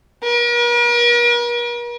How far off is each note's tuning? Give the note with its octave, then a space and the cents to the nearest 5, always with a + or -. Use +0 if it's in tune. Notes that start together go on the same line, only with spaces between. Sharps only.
A#4 +45